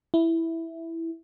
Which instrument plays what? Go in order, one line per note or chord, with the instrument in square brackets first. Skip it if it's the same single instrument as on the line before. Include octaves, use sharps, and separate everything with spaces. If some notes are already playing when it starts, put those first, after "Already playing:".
[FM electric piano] E4